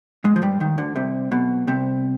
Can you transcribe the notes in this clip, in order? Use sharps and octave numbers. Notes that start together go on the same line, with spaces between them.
G#2 G#3
F3
G2 G3
D#2 D#3
D2 D3
C2 C3
B1 B2
C2 C3